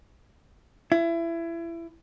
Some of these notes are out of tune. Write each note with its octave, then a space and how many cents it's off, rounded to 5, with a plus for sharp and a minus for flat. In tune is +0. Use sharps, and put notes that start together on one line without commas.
E4 +25